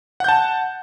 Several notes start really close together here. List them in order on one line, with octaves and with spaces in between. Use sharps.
F#5 G6 A5